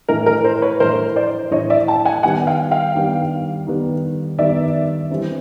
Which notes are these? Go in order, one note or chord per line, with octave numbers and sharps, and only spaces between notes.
A2 E3 A3 A#4
A#4
A#4 C5
B4 C#5
A2 E3 A3 A#4 C5
C5 D5
A2 E3 A3 C#5 D#5
D5 E5
G5 A5
F#5 G#5
D#3 G3 B3 F#5 G#5
F5 G5
F5 G5
D#3 G3 B3
D#3 G3 B3
D#3 G3 B3 D5 E5
E3 G3 C4 E4